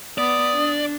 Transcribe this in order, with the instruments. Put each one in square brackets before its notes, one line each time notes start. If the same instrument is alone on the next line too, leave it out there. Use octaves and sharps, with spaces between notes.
[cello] B3 [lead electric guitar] D5 [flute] D#6
[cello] D4